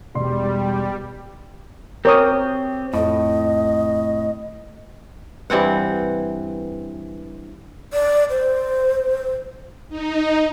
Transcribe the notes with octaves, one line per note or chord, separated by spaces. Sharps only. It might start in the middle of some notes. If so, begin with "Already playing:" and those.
E1 G3 D5 C6
C4 G4 A#4 C#5 D#6
F2 A2 D#5
G2 E3 C4 F#5
D5
C5
D#4